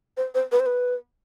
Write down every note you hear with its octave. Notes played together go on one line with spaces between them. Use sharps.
C5
C5
B4
C5
B4